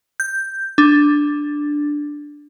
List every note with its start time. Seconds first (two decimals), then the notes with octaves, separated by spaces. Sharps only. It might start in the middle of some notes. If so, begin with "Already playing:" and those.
0.20 G6
0.78 D4